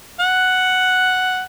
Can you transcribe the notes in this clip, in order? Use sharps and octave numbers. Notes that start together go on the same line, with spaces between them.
F#5